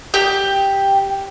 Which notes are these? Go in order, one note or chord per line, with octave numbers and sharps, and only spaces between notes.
G4